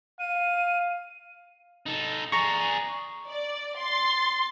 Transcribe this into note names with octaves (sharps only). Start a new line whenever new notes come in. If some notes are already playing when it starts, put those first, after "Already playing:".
F5 D#7
D#4 A4
G#4 D5 A#5 C#6
D5
C6 A6